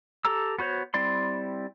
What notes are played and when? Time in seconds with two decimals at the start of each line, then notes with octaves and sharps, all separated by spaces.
0.25 G4 A4 A#5 E6
0.59 B3 F#4 C5 C#5
0.94 G3 C4 E4 D5 C6